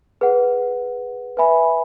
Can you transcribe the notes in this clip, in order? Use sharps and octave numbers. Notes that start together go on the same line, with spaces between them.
G#4 B4 F#5
B4 E5 G#5 B5